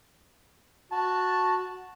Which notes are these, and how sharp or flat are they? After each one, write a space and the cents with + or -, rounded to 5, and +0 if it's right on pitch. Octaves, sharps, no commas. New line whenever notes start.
F#4 -10 A5 +0